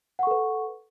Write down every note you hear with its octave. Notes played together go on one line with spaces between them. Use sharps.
A4 B4 F#5 C#6